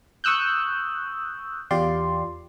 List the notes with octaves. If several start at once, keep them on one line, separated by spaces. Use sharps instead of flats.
C#6 D#6 E6 F#6 G6
E2 F4 G4 D5 C6